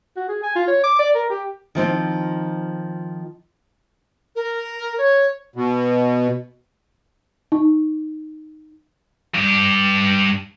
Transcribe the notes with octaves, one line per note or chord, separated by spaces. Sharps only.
F#4
G#4
G#5
F4
C#5
D6
D5
A#4
G4
D#3 F3 C4 D#4
A#4
C#5
B2
D#4
G2 G4